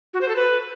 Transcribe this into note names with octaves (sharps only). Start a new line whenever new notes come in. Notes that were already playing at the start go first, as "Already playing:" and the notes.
F#4
C5
A4
B4